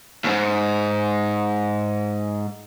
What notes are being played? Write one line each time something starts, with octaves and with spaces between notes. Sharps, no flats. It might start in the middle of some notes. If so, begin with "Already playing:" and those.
D#2 G#2